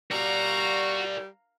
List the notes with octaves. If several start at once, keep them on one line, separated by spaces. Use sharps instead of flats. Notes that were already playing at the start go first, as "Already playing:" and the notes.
G3 F#4 A#4 D5 F5 A#5